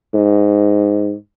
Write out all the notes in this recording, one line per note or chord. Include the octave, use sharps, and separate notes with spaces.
G#2